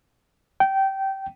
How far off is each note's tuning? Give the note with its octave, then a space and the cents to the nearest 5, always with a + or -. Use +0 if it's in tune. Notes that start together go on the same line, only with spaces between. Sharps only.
G5 -20